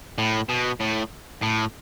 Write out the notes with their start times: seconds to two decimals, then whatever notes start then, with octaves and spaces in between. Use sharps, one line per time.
0.18 A2
0.49 B2
0.80 A2
1.42 A2